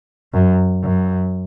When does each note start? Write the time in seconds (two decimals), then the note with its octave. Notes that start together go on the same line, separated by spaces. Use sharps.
0.33 F#2
0.83 F#2